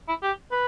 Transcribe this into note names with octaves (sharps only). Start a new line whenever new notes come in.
E4
G4
B4